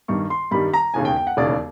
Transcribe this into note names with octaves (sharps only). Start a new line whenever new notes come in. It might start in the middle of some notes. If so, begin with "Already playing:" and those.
G2 D#3 G3 C#6
C6
G2 D#3 G3 B5
A#5
E1 D#2 C#3 G#5
G5
G5
F#5
E1 D#2 C#3 D5